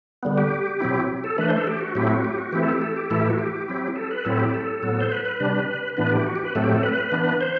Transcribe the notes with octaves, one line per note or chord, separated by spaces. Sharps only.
D3 G3 B3
G4
B2 F#3 C4 E4
A4
E3 A3 D4 B4
C5
A4
G4
F#4
A2 F#3 A3 C4 E4 G4
F#4
G4
F#4
E3 A3 C4 E4 G4
A4
G4
A4
G4
A2 E3 A3 E4 A4
G4
F#4
G4
F#3 C4 E4
A4
B4
A2 F#3 C4 E4 A4
G4
A4
A2 F#3 B3
C5
B4
B4
C3 G3 D4
A2 E3 B3 D4 B4
G4
F#4
G4
B4
A2 F#3 A3 C4 A4
G4
A4
B4
E3 B3 D4
C5